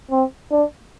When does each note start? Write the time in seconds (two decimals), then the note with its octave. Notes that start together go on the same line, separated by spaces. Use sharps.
0.11 C4
0.51 D4